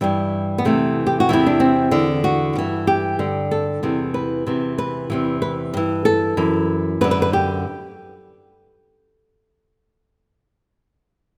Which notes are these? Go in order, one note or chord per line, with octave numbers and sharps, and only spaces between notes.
G2 E3 G3
B3
E2 C3 E3 A3
G4
F#4
E2 C3 E3 E4
D4
C4
E2 D3
F#4
G2 E3
G4
G2 D3
A4
E2 C3 E3
B4
E2 C3 E3
B4
E2 C3 E3
B4
G2 E3
A4
F#2 E3
F#2 D3 B4
B4
B4
G4